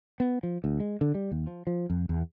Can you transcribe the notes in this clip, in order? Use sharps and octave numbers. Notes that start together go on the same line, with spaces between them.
B3
F3
D2
G#3
D3
G3
D#2
F3
F3
F2
E2